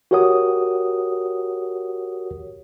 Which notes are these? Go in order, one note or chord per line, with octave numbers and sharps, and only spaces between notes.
F#4 G4 A#4 C#5 F#5 D#6